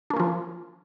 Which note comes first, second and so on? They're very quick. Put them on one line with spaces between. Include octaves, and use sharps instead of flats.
D4 A#3 C#4 F3